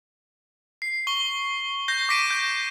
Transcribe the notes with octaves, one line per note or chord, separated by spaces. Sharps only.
C7
C#6 G7
G6 A#6 C7
D6 A#6 B6 D7 D#7
G6